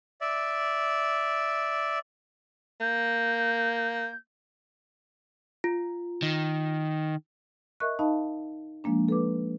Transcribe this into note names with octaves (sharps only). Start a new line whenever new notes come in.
D5 E5
A#3 G6
F4
D#3
A#4 D#5 E5 C#6 F#6
D#4 D#5 F5 A5 B5
F3 G#3 A#3 D4
A4 B4 D6